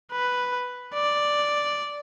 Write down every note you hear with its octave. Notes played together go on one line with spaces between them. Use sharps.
B4
D5